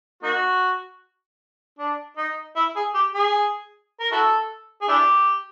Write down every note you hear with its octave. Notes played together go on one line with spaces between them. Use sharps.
A#3 D#4 F#4
D4
D#4
E4
G#4
G4
G#4
A#4
E4 F#4 A4
G#4
D4 E4 G4